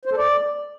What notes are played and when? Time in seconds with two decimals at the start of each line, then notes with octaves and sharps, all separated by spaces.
0.05 C5
0.11 A4
0.17 D5